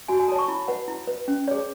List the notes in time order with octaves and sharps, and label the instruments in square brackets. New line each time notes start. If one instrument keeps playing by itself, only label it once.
[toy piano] F#4 G#5
G#5
A4 C#5 A5
C#6
E4 B5
B4 F#5
E4
B4
C#4
C#5
G#4
C#5